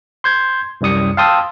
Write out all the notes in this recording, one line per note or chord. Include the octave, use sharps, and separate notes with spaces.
C6 G6 G#6
C2 F#2 G3 D#6 C#7
F5 G5 A5 C6 D#6 E6